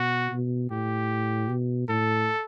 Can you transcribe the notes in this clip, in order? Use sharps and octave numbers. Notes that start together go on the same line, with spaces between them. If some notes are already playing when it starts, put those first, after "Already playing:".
Already playing: B2 F#4
B2
A2 G4
B2
A2 A4